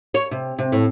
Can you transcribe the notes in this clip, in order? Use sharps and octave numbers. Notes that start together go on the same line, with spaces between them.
C#5
C3
C3
A2